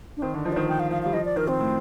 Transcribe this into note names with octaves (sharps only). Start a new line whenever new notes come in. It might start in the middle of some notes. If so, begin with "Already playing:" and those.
D4
D#3 C4
D3 D4
F3 D#4
D5
D#3 C5
F3 G5
F5
F3 F5
G3 F5
F3 D#5
D5
D#3 A#4
C4
A2